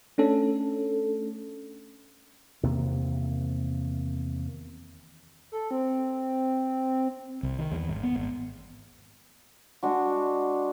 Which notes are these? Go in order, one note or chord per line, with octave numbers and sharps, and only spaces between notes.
A3 C#4 D4 A4
E2 C3 D#3 A#3
A4
C4
C2
D#3
E2
G#1
B3
G#1
G#3 D4 F#4